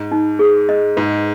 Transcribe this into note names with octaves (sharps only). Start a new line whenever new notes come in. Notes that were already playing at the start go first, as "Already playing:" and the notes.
Already playing: G#2
D#4
G#4
D#5
G#2 B4